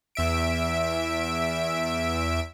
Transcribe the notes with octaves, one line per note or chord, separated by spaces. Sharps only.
E2 E5 D7